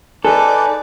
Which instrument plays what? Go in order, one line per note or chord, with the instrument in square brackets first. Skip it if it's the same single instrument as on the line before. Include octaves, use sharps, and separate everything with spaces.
[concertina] D#4 B4 [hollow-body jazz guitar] A4 [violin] D5 [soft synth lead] G#5